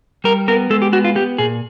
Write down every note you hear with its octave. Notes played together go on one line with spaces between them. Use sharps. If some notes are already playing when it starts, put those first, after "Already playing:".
G3 A#4
B3 A#4
G#3 A4
G4
B3 F#4
F4
B3 G4
A#2 G#4